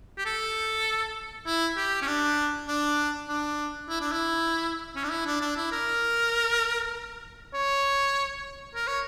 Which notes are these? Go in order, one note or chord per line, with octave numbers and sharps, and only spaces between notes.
G4
A4
E4
G4
C#4
D4
D4
D4
E4
D4
E4
C#4
D4
E4
D4
D4
E4
A#4
C#5
A#4
C#5